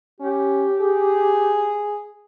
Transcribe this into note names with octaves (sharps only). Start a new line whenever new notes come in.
C#4 G4
G#4